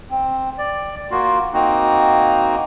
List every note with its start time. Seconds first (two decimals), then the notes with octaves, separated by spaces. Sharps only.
0.10 C4
0.58 D5
1.11 A#3 F4 F#4
1.53 A#3 C4 D#4 F#4